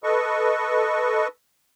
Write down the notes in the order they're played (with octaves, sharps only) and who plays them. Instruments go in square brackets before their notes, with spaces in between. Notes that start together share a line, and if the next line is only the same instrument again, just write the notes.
[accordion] A4 B4 D#5 C#6